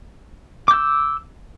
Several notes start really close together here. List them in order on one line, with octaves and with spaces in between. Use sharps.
D6 G6 E6